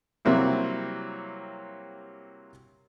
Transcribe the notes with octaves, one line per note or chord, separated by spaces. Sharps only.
C3 F#3 G3 A#3 C4 E4